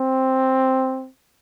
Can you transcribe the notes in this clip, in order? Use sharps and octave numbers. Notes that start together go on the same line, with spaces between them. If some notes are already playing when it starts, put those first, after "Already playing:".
Already playing: C4